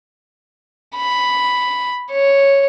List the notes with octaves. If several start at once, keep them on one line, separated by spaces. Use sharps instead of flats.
B5
C#5